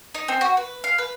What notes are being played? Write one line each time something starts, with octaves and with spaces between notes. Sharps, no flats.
D#4
C4
F#4
B4
F5
B4